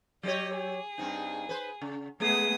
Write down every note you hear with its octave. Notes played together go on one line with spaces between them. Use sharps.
F#3 G4 C#5 D#5
G#4
G2 C4 D#4
B4 C5
C#3
G#3 A3 B3 G#4 D#6